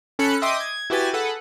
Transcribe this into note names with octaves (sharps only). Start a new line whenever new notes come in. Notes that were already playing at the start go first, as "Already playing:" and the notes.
C#4 A4 B5 F#6 C#7
D#5 E5 G5 C6 D6 D#6
G#6
E4 F#4 G4 B4 G#5 A6
G#4 A4 B4 F#5